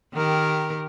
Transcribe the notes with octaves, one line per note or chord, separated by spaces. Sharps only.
D#3 G4 A#4